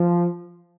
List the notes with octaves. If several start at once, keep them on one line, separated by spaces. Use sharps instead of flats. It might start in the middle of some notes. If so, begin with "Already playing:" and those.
Already playing: F3